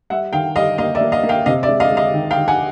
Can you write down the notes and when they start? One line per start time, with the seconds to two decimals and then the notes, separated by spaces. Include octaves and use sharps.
0.10 G3 E5 F#5
0.33 D#3 F5 G5
0.56 G3 D#5 F5
0.78 A#3 D#5 F5
0.95 D5 E5
1.01 A#3
1.12 D#5 F5
1.23 A#3
1.29 F5 G5
1.46 C3 D#5 F5
1.63 D5 E5
1.69 G#3
1.80 D#5 F5
1.91 G#3
1.97 D#5 F5
2.14 D#3
2.31 F5 G5
2.37 D#3
2.48 F#5 G#5